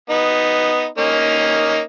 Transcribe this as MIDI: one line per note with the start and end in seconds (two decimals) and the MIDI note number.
0.10 0.86 59
0.10 0.86 63
0.98 1.79 58
0.98 1.79 61
0.98 1.79 63